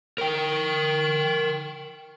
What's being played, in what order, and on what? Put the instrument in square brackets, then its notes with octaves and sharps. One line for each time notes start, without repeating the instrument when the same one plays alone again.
[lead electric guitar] A#4 G5